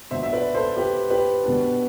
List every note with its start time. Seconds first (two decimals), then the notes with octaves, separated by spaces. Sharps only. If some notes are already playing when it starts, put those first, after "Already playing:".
0.10 B2 B3 D4 C5 E5
0.23 E5
0.32 B4 D5
0.54 A4 C5
0.76 G4 B4
1.10 G4 B4
1.43 B2 B3 D4